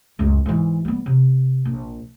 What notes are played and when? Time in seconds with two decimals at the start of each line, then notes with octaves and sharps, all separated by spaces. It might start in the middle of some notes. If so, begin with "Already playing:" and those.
0.19 C#2 F#2
0.46 G#2 E3
0.85 G3 B3
1.06 C3
1.65 A#1